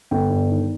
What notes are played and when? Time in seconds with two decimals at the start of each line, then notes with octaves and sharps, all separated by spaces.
0.11 G1 G5
0.30 G2
0.50 D#3